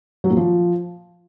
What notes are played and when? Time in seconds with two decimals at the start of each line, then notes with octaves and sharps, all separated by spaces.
0.24 F#3
0.30 A#2
0.37 F3